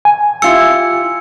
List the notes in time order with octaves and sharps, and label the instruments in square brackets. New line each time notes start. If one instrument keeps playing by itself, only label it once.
[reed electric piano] G#5
[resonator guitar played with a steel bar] E4 F4 G4 [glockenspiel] E6 C#7